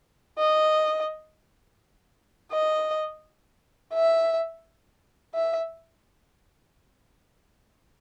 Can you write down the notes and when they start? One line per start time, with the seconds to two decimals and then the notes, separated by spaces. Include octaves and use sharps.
0.39 D#5
2.52 D#5
3.94 E5
5.34 E5